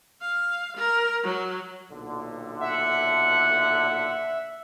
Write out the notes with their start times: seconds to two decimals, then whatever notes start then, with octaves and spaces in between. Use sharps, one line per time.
0.21 F5
0.77 A#4
1.24 F#3
1.91 B1 A#2 D3
2.60 E5 F#5